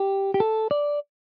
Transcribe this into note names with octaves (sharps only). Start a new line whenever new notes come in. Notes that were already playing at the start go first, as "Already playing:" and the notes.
Already playing: G4
G4
A4
D5